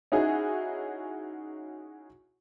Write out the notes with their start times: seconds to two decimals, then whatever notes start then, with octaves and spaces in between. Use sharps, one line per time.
0.12 C#4 D#4 E4 F#4 G#4